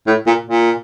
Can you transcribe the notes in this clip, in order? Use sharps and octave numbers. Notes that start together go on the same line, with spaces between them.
A2
A#2
A#2